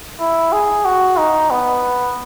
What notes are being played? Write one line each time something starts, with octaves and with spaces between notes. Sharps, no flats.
E4
G#4
F#4
D#4
B3